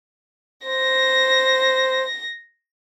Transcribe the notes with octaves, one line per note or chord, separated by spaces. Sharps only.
C5 A#6